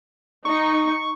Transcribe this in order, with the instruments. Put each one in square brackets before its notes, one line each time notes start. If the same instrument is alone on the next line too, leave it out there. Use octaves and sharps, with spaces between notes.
[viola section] D#4 [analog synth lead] C#6